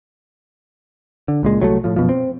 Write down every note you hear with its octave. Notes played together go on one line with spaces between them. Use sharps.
D3
C#2 A#2 G#3
C2 F#3 G#3 A3
A2 F3
F#2 B2 F3
C4